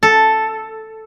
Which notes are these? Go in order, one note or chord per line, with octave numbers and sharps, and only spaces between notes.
A4